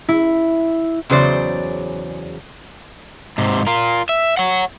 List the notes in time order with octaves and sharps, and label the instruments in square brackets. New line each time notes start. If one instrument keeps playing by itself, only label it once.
[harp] E4
[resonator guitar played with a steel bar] E2 C#3 F#3 C5 D5
[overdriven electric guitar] G#2 C3
F4 A#4
E5
C#5 F#5